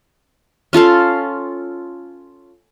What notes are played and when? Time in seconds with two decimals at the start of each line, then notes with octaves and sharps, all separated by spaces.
0.73 C#4 F4 A4 F5